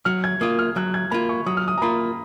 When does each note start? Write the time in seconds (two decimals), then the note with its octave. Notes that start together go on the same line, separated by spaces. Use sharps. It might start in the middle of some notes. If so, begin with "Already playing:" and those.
0.05 F#3 F6
0.24 G#6
0.41 A#3 F4 D#6
0.59 F6
0.76 F#3 F#6
0.94 G#6
1.11 A#3 F4 B5
1.29 C#6
1.46 F#3 D#6
1.57 F6
1.68 D#6
1.78 A#5
1.82 A#3 F4 B5